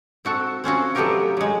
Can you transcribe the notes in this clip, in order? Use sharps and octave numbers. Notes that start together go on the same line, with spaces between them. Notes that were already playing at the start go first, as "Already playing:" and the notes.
C4 F#4 A4
C4 C#4 F4 F#4
F#3 A3 B3 F4 G4 A#4
F#3 G#3